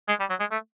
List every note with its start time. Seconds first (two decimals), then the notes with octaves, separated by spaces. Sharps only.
0.09 G#3
0.20 G3
0.30 F#3
0.40 G#3
0.51 A3